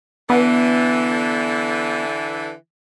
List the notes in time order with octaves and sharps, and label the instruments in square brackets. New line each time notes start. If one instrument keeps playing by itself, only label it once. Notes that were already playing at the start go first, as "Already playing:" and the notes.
[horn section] D3 E3 [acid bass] B3